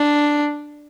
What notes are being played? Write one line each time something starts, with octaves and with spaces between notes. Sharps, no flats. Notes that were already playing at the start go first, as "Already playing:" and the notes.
Already playing: D4